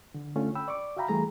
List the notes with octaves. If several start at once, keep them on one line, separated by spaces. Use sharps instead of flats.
D3
D3 A3 C#4 F4
G5 B5 E6
D5 C#6 D6
F#4 E5 F5 G5 A#5 B5
E3 G3 A3 G#4 A#5